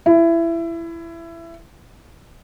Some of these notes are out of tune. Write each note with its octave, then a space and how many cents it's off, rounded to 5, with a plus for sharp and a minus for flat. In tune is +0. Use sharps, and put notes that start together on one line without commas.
E4 +20